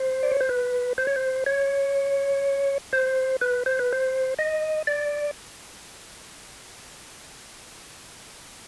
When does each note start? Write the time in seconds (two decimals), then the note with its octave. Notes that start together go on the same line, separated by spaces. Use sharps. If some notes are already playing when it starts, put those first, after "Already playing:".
Already playing: C5
0.23 D5
0.32 C#5
0.41 C5
0.49 B4
0.98 C5
1.07 C#5
1.16 C5
1.46 C#5
2.93 C5
3.41 B4
3.66 C5
3.79 B4
3.93 C5
4.39 D#5
4.87 D5